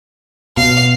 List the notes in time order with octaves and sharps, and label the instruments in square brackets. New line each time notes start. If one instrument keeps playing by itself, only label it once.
[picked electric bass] B2 [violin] F5